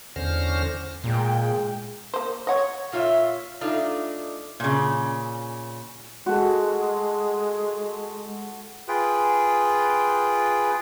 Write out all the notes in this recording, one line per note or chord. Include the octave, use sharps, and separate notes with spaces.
E2 D3 C#4 C5 F6 A#6
A#2 G#3 G#4 G5
A#3 C5
C#5 D#5 F#5
A#2 F4 C#5 E5
A3 D4 D#4 F4
A#2 C#3
G#3 F#4 A4
F4 G#4 B4 G5